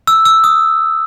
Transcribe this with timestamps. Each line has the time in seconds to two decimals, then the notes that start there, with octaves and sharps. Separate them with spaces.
0.07 E6
0.25 E6
0.44 D#6